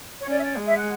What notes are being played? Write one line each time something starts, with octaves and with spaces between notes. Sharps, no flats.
C#5
C#4 D5
E5
D5
G#3
E5
F#5